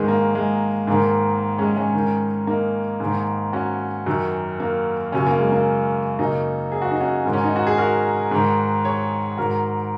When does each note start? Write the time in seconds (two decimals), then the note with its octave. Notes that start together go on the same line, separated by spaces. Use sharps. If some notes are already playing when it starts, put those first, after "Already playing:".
Already playing: G#2 D#3 G#3
0.08 A#3
0.35 G#3
0.87 G#2 D#3 A#3
1.58 G#3 C#4
1.76 G#3 C#4
1.94 G#2 D#3
2.47 A#3 D#4
3.00 G#2
3.05 D#3
3.53 C#4 F#4
4.06 F#2 D#3
4.60 A#3
5.12 F#2 C#3 C#4
5.27 A#3
5.39 G#3
5.52 A#3
6.19 F#2 C#3 A#3 D#4
6.72 G#4
6.82 F#4
6.91 D#4
7.00 C#4 F#4
7.25 G#2 D#3
7.33 C#4
7.44 D#4
7.56 F#4
7.67 G#4
7.78 F#4 A#4
8.31 G#2 D#3
8.85 G#4 C#5
9.37 G#2 D#3 F#4 A#4